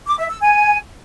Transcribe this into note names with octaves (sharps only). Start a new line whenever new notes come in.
D6
E5
E6
G#5